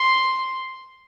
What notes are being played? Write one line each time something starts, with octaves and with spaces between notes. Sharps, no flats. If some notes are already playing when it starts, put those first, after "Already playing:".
Already playing: C6